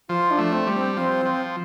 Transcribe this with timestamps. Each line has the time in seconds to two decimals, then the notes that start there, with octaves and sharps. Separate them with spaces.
0.09 F3 F4
0.31 D4
0.38 A3
0.52 C4
0.67 G3
0.74 C4
0.96 F3 C4
1.26 F3